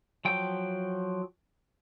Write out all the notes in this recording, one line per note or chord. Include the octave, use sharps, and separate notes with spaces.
F3 F#3 G5